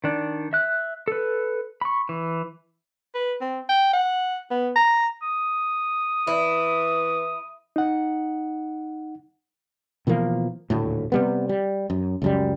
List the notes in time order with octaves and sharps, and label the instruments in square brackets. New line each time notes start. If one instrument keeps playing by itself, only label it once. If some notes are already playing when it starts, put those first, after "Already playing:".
[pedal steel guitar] D#3 D4
E5 F#6
A4 B4
B5 C#6
E3
[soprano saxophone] B4
C4
G5
F#5
B3
A#5
[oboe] D#6
[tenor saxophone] E3 [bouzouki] E4
[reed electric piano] D#4 F#5
[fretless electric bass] B2 E3 F3 A#3
D#1 D2 A2
C3 G3 B3
G3
F#2
C#2 F#2 G3